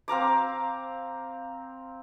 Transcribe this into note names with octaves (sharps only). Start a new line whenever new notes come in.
C4 F5 A#5 D6